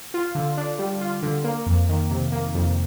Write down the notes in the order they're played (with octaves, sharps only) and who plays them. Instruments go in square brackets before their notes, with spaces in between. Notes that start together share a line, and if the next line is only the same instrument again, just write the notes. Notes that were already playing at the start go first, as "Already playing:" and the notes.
[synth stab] F4
D3
D4
G3
F4
D3
A#3
F2
D#3
C3
A#3
F2